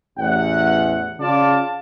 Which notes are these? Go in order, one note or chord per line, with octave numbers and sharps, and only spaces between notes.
A1 E2 F#5
C#3 F4 D5 A5